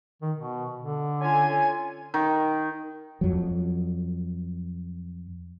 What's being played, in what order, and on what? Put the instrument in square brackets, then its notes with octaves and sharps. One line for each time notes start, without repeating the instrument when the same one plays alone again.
[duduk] D#3
B2
D3
[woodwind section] C#4 F4 G#5
[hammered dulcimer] D#3
[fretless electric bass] F2 F#3